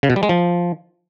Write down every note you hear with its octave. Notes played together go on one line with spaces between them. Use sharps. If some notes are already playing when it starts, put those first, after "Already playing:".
C#3
B2
G3
G#3
F3